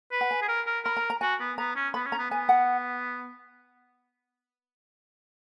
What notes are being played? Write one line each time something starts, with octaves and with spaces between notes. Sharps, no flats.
B4
F#5
G#5
G#4
A#4
A#4
A#4 B5
A#5
A#5
F#4 G#5
B3
B3 A#5
C#4
B3 B5
C#4
A#5
B3
B3 G#5
F#5